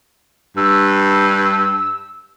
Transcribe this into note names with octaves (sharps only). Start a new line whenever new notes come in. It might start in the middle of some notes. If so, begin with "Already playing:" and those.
G2 E6